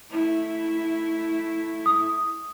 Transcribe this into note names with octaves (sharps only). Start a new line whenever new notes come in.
A3 E4
D#6